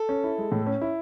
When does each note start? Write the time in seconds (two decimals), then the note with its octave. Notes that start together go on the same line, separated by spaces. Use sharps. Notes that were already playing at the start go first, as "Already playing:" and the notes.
Already playing: A4
0.09 C#4
0.24 E4
0.38 G#3
0.52 A2
0.66 C#4
0.81 E4